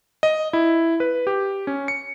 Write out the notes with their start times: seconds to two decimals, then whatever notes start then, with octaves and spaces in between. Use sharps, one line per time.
0.23 D#5
0.53 E4
1.00 B4
1.27 G4
1.67 C#4
1.88 C#7